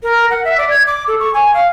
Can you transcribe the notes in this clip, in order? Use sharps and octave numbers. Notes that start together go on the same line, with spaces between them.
A#4
F#5
E5
D5
G#6
D6
A4
C#6
G#5
F5